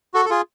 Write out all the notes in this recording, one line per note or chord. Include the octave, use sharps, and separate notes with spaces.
F#4 A4
A4
F4 G#4